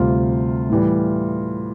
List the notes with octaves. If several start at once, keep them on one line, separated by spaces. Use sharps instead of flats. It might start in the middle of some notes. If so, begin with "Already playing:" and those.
Already playing: D2 C3 G3 F4
A2 E3 G3